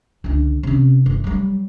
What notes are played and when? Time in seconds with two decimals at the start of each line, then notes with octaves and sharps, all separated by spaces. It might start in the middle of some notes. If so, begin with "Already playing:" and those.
0.24 C#2 D3
0.63 C3 C#4
1.06 F#1
1.24 F#3 G3